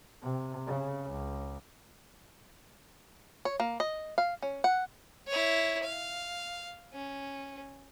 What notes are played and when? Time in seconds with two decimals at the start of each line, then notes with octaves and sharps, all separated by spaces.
0.22 C3
0.67 C#3
1.10 C#2
3.45 C#5
3.60 A#3
3.80 D#5
4.18 F5
4.42 C#4
4.64 F#5
5.28 E4 C#5
5.83 F5
6.93 C#4